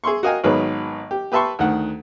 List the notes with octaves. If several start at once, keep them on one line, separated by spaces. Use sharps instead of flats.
G#4 E5 C6 C#6
F#4 A#4 D#5 F5 G5 G#5
G#1 D#3 F#3 B3 G#4 B4
G4
G4 B4 E5 A5 C6 C#6
D2 D#3 F#5